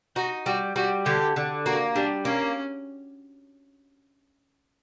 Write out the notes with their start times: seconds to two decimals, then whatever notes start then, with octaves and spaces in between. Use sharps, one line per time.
0.16 D#4 F#4
0.46 G3 F#4
0.76 G3 F#4
1.05 D3 G4
1.36 D3
1.65 A#3 F#4
1.95 G3 D4
2.25 A#3 C#4